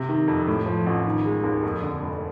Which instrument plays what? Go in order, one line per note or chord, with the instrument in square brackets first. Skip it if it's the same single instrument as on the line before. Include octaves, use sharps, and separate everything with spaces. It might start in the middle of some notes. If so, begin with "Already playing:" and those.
Already playing: [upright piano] C3
D#3
F2
A2
F3
A1
D#3
G#3
D#2
F2
D3
F1